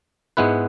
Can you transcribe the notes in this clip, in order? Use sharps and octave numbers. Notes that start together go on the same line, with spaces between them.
G#2 G#3 B3 E4 B4